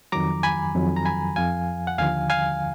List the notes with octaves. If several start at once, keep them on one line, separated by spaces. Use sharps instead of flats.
F2 D#3 F#3 A#5 D6
G#5 B5
F2 D#3 F#3
A#5
G#5 B5
F2 F3 F5 G#5
F#5
D#2 D3 F3 F5 G#5
F5 G#5